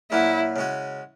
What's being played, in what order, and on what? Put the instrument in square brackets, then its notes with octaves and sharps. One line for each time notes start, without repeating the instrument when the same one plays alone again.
[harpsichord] A#2 F#3 C#4 F#4 [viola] E4
[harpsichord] C#3 G#3 C#4 F#4